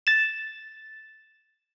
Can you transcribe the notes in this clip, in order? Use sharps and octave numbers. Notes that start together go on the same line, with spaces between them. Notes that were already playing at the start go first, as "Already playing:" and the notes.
A6 E7